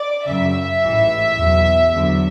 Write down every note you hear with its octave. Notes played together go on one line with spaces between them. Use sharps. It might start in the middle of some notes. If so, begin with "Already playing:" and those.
Already playing: D5
F#2 C#3 F#3 E5
A1 G#2 E3
E2 B2 F#3
E2 D3 F#3